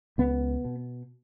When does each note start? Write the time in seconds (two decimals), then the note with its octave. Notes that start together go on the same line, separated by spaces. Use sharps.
0.18 C#2 B3
0.64 B2